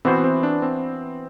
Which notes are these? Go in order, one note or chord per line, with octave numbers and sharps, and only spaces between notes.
E3 B3 C4 F#4 C5
C4
D4
C4